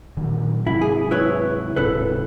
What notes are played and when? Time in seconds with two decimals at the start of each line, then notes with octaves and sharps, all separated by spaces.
0.17 A#2 D#3 F#3
0.67 G#2 C3 F#3 E4
0.81 G#4
1.11 E4 B4 C#5
1.76 D1 G#2 C3 E4 A4 B4